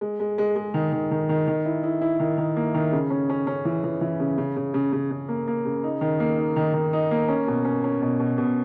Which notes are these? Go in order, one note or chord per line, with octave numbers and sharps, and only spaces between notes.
G#3
G#3
G#3
G#3
D#3
D#3
D#3
D#3
D#3
E4
E4
E4
D#3
D#3
A#3
D#3
C#3
C#4
C#4
C#4
E3
E3
E3
C#3
C#3
C#3
C#3
C#3
C#3
A#3
A#3
C#3
D#4
D#3
A#3
D#4
D#3
D#3
D#4
A#3
C#4
B2
C#4
C#4
B2
B2
B2